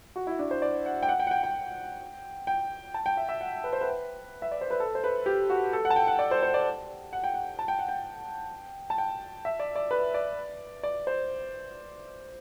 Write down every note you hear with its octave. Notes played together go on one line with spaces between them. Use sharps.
F#4
E4
D4
C5
D5
F#5
G5
F#5
G5
F#5
G5
G5
G5
A5
G5
E5
E5
F#5
B4
C5
B4
E5
D5
C5
B4
A4
C5
B4
G4
F#4
A4
F#5
A5
G5
F#5
D5
C5
C5
D5
F#5
G5
F#5
A5
G5
F#5
G5
A5
G5
E5
D5
D5
B4
D5
D5
C5